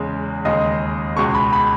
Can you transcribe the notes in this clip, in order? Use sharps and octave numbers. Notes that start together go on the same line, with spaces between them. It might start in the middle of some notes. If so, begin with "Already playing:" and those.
Already playing: E2 C#3 G#3
D#2 C#3 G#3 D#5
C#2 B2 G#3 C#6
B5
B5